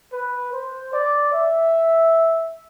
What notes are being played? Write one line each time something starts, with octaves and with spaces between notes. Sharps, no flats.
B4
C5
D5
E5